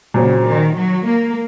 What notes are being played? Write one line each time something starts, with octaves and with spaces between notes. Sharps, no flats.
A#2 C#3 F#3 C4
D#3
F#3
A#3